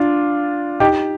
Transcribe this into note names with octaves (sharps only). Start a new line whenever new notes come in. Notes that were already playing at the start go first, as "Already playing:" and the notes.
Already playing: D4 F4
D#4 G4